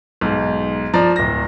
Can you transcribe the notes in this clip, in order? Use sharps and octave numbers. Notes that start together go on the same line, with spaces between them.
B1 G#2
F3 D5 A#5
D1 A#6